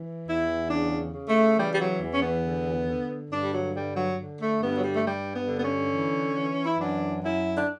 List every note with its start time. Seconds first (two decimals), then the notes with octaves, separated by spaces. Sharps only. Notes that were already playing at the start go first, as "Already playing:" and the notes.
Already playing: E3
0.27 E2 E4
0.70 C#3 D4
1.14 C#3
1.28 A3
1.58 E3 G3
1.74 G3
1.80 F#3
2.01 E2
2.14 C#4
2.22 B3
2.45 D3
2.88 D3
3.31 G2 D4
3.43 G3
3.53 F#3
3.74 D3 G3
3.96 F#3
4.18 D3
4.40 A3
4.62 G2 B3
4.76 F#3
4.84 G3
4.96 A3
5.05 G2 G3
5.35 B3
5.48 D3
5.58 B3
5.63 C#4
5.93 E3
6.36 E3
6.66 E4
6.79 F#2 D4
7.22 F#2 E4
7.56 D4